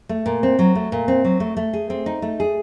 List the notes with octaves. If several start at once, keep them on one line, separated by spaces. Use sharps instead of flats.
A3
A#2
C4
F#3
A3
A#2
C4
F#3
A3
A3
G#4
C4
D#4
A3
G#4